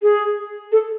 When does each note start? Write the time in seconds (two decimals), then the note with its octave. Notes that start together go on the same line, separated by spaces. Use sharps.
0.02 G#4
0.72 A4